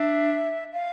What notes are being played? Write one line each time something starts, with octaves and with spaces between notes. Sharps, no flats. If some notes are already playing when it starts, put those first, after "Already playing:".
Already playing: D4 E5
F5